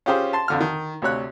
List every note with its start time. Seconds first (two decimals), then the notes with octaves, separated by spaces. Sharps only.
0.06 C#4 F4 G4 G#4 C5
0.33 A5 C6
0.48 F2 D3 F6
0.60 D#3
1.02 D2 C3 C#5 F#6